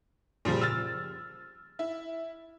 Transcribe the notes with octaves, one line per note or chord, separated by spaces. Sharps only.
A#2 C#3 F3 G3
E6 F6 A6
E4